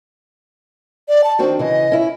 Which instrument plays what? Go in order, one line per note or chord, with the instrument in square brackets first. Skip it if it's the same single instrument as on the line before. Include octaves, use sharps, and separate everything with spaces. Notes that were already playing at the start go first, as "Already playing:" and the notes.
[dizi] D5
A5
[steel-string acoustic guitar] D#3 C4 D4 [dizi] F#4
[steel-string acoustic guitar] C#3 E3 [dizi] D#5
[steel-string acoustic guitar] C#4 E4